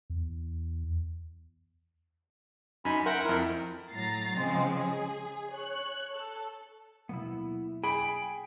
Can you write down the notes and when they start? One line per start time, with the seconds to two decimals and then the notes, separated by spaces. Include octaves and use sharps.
0.10 E2
2.85 F#2 D#4 G#5 B5
3.06 A#4 E5 F#5 G5 C6
3.25 F2 E4 A#4
3.92 A2 F#3 A#5 A6 C7
4.36 C#3 F3 G#3 C4
4.77 G#4
5.52 C#5 F#6
6.15 A4
7.09 B2 F#3 A#3 B3 E4
7.84 G#4 G5 B5